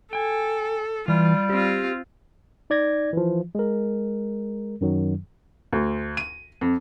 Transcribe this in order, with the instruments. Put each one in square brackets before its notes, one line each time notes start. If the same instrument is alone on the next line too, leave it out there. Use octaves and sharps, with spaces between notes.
[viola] A4 [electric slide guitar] G5 G#5
[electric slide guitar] E3 [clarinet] G3 [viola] F4
[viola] C4 F4 [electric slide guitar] G4
[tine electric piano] D#4 D5 G#6 A#6
E3 F3
G#3 A#4
F#2 D#3 F#3
[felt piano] D2
D#7
F2